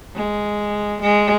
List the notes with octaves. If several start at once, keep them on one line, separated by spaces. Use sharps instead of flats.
G#3
G#3